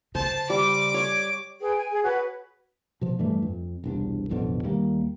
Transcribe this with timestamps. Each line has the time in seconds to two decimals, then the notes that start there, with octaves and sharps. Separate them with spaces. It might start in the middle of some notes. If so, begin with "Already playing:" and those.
0.15 C#3 C5 A5
0.50 G3 D6
0.94 C#5 C#6
1.60 G#4 B4 G5
1.77 G5 G#5
1.91 G#4
2.03 F#4 B4 C#5 F#5
3.01 B2 F3
3.19 G2 E3 G3 A3
3.42 F2
3.84 E1 C2 D4
4.31 A1 F2 B2 D3
4.63 D#2 G3 A#3